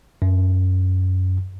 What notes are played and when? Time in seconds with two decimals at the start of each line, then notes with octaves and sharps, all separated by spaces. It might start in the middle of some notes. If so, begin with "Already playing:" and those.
0.22 F#2